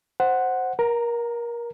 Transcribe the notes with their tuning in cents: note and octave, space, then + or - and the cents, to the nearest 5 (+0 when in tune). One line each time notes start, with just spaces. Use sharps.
C5 +0 F#5 +0
A#4 +25 A#5 -5